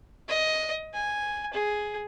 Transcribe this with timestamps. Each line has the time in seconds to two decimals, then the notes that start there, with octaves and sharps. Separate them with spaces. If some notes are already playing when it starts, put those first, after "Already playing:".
0.29 D#5
0.94 G#5
1.54 G#4